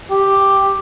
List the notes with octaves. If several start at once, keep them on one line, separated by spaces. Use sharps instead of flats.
G4